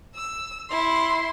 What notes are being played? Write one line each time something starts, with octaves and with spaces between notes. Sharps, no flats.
E6
E4 C6